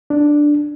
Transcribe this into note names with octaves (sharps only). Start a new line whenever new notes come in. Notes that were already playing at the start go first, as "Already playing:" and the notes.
D4